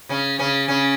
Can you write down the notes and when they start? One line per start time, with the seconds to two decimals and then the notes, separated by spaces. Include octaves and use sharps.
0.09 C#3 C#4
0.39 C#3 C#4
0.68 C#3 C#4